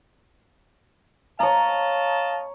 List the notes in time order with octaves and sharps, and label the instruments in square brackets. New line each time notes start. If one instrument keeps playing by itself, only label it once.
[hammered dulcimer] C#5 A#5 [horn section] D#5 F5 A5